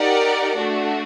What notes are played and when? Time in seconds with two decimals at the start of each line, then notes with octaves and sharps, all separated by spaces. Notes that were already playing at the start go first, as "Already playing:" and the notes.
Already playing: D#4 G4 A#4 D5 F#5
0.56 A3 D4 F#4